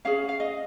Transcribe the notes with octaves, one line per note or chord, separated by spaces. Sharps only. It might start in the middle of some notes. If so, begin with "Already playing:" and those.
C#4 G#4 F5
F5
D#5